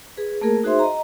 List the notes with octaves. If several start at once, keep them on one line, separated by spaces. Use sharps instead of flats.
G#4 B4
A3 A#3 G#4 A#4
D#4 F#4 G#4 C5 E5 C6
D#5 A#5